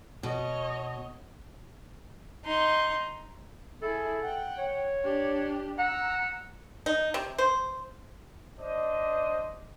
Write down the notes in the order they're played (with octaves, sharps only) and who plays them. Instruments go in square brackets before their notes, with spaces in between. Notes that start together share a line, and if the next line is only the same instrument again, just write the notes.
[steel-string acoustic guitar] B2 [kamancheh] C#5 D#5
[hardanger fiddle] D#4 C6
[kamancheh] E4 G#4 [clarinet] A4
[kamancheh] F#5 G5
[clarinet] C#5
[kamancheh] D4 G4
[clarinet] F#5 [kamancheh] A#5 E6
[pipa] D#4
C3
C5
[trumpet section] D4 C5 D#5